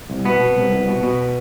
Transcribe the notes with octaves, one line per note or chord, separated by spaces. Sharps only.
C2
B2 B3
B2
C2
C2
B2
B2